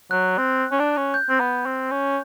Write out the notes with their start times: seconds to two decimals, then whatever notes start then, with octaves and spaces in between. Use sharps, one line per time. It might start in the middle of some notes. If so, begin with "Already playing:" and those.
0.11 F#3 F#6
0.38 C4
0.71 C#4
0.79 D4
0.97 C#4
1.14 G6
1.29 C4
1.40 B3
1.66 C4
1.91 C#4